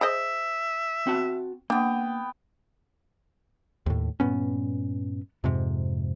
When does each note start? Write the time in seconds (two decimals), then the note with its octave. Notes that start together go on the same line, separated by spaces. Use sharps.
0.01 G#4 C5 D#5 E5
1.07 C4 F#4 A5
1.70 A#3 B3 D4 G5
3.86 D#2 A2
4.20 G2 A#2 B3 C#4
5.44 F2 G#2 C3